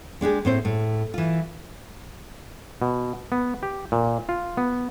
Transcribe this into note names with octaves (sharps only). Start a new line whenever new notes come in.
G#3 D4 G4 G#4
A2 C4 C5
A2
E3 F4
B2
B3
G4
A#2
F4
B3